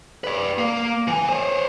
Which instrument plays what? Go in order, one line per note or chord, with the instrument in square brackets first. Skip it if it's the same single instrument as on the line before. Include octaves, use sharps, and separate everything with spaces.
[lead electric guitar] B4 D5
A#3
E3 G#5
C5 C#5